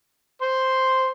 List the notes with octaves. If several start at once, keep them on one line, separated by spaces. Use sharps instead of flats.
C5 C6